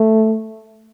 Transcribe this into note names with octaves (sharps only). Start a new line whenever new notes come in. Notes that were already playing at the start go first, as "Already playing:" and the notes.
Already playing: A3